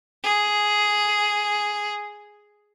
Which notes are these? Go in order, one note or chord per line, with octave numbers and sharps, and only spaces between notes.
G#4